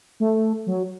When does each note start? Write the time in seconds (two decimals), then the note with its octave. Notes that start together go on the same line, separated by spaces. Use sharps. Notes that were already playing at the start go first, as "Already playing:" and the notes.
0.20 A3
0.66 F#3